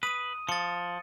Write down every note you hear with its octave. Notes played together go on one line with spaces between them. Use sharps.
B4 D#6 D#7
F3 A6 C#7